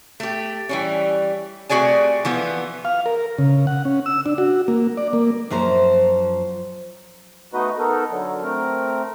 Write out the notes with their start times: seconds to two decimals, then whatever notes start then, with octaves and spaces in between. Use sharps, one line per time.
0.20 A3 G4
0.69 E3 G3 C#4
1.69 C3 A3 F#4 G#4 D5 G#5
2.25 E3 F3 B3
2.85 F5
3.06 A#4
3.38 C#3
3.67 F#5
3.85 C#4
4.06 E6
4.26 D4
4.38 F#4
4.68 A#3
4.97 D5
5.13 A#3
5.50 F#2 F3 C5 A#5
7.54 A3 B3 D#4 F#4 B4 D#5
7.79 B3 D#4 A4 A#4
8.10 D3 F#3
8.43 A3 C4 A#4